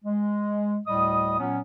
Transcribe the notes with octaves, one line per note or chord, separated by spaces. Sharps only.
G#3
D2 A2 G3 D#5 D#6
A#2 F#3 B3 C#4